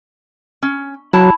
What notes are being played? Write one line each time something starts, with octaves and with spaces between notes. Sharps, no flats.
C#4
F#3 E4 A5